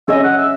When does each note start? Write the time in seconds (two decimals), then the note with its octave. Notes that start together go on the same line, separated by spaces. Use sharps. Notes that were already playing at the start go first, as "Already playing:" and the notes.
0.08 C#4 G#4 D#5 E5
0.24 F#5
0.38 E5